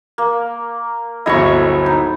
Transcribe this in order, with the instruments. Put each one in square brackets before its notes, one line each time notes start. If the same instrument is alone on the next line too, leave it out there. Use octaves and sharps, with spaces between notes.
[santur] A#3
[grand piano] D1 G1 D#5 [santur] E4 B5 C#6
[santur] D#4